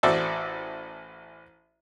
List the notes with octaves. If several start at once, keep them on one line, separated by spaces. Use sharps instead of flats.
A1 F#4 A4 C5 D5 E5